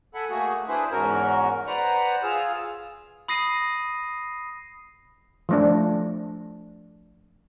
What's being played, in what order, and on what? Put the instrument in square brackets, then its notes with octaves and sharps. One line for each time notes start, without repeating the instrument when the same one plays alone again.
[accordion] A4 F#5 G#5 B5
A3 A#3 F#4 G#4
D4 E4 G#4 B4 C5
E2 G#2 C#4 F#4 A#4
B4 C5 D5 F#5 A#5
F4 G#4 E6 F6
[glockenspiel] B5 D#6 A#6 C7 D#7
[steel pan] F3 A3 D4